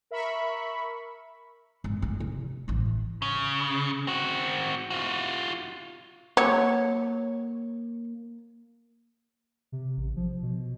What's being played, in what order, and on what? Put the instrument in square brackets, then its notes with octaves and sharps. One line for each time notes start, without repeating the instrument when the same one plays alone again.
[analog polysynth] A#4 E5 B5 C#6
[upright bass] G#1
A3
C3
A1 E3
[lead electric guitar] C#3
C4 F#4
F4 F#4
[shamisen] F#3 [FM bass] A#3 [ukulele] C#5
[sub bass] C3
A1
F3
B2